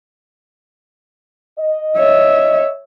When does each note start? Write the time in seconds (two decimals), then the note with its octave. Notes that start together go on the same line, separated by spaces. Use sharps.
1.59 D#5
1.97 C#5 E5